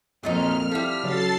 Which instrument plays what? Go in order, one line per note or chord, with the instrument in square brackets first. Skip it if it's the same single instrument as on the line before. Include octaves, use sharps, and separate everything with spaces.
[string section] F2 A#2 [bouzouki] F#3 A3 D#4 [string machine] F6
[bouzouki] F3 G3 [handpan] E4 A4 [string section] B6
[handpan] C#3 F#3 [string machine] A4 A6 C7